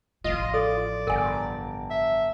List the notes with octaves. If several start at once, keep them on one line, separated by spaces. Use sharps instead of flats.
A1 F3 F4 D#5
A4 D5
G1 A#4 F#5 G#5
E5